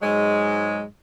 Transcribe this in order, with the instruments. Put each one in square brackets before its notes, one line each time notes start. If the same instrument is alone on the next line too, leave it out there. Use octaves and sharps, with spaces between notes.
[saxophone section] G#2 F#3 G#3